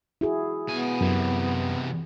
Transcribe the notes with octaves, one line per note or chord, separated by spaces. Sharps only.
E4 F#4 G#4
B2 B3 G#5
F#2 C3 E3